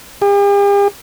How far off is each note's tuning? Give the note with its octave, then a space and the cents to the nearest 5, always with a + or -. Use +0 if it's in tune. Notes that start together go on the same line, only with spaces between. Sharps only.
G4 +45